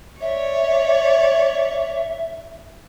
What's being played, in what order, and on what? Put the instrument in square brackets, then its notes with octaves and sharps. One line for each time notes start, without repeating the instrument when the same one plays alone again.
[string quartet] C#5 D5 [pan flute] E5